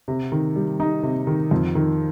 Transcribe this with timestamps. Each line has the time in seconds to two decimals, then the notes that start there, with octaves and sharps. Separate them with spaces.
0.08 C3
0.32 D#3
0.56 G3
0.80 D#4
1.03 C3
1.27 D#3
1.51 F2
1.75 D#3